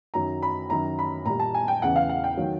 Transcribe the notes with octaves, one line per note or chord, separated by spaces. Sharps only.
F#2 D#3 F#3 A#5
B5
F#2 D#3 F#3 A#5
B5
A#2 G3 A#5
A5
G#5
G5
E2 C#3 E3 F#5
F5
F#5
G5
D#3 F#3